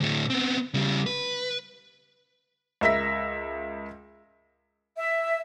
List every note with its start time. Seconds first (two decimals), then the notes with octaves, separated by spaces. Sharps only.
0.01 D2 A2
0.30 B3 C4
0.74 C#3 G3
1.06 B4
2.81 C#2 A#4 E5 E6 A#6 B6
4.97 E5